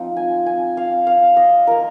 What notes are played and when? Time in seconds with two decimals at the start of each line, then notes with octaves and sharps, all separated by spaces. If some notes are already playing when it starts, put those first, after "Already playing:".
Already playing: F3 C4 D#4
0.16 G#5
0.46 G#5
0.77 F5
1.07 F5
1.37 D#5
1.67 A#3 F4 A#4